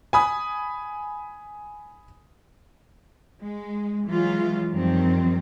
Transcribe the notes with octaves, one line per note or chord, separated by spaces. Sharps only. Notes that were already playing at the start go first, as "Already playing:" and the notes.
G#5 B5 D#6
G#3
E3 F#3 G#3 F4
F#2 D#3 F3 G3 C4